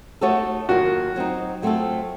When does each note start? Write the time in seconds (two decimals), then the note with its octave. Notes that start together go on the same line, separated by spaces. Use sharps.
0.21 A3 D#4 F#4 A4 C#5
0.69 F#2 D#3 A#3 F4 F#4
1.16 F#3 C4 D#4
1.62 F#3 A3 C4 F4 A4